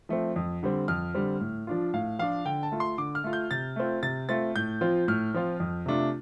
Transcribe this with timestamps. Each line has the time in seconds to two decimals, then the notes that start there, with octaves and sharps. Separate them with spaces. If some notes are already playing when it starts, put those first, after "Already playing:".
0.09 F3 A3 C4
0.36 F2
0.63 D3 G3 C4
0.88 F2 F6
1.14 D3 G3 C4
1.40 A2
1.67 F3 D4 F4
1.93 A2 F5
2.19 F3 D4 F4 F5
2.45 D3 G5
2.63 A5
2.72 A3 F4
2.80 C6
2.98 D3 D6
3.15 F6
3.24 A3 F4
3.33 G6
3.51 C3 A6
3.76 A3 C4 F4
4.03 C3 A6
4.29 A3 C4 F4 A6
4.56 A2 G6
4.81 F3 C4 F4
5.08 A2 F6
5.34 F3 C4 F4
5.60 F2
5.86 C3 A3 D4 F4